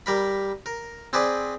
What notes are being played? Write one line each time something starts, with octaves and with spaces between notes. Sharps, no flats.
G3 A#4 B5
A#4
C4 G#4 B4 D5